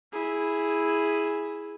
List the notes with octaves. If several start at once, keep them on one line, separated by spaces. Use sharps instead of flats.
E4 G#4